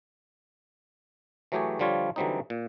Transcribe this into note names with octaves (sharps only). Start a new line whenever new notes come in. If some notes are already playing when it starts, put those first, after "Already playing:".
E3 F#3 A3 G4 G#4 C#5
D3 F3 G3 F4 C#5
D3 E3 F#3 G3 C4 D#4
A#2